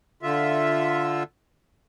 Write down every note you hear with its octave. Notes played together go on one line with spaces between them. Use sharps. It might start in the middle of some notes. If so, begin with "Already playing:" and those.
D3 F4 E5